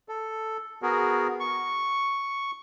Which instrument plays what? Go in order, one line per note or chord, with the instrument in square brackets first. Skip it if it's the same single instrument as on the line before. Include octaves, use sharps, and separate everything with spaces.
[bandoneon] A4
B3 F#4 G#4 A#4
C#6